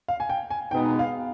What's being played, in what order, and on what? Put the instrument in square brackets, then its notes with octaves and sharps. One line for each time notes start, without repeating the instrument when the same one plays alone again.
[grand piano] F5
G#5
G5
G#5
[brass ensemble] B2 G#3 B3 D#4 [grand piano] G5
[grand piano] F5